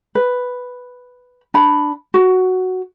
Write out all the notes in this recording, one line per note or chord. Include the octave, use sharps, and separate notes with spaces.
B4
D4 B5
F#4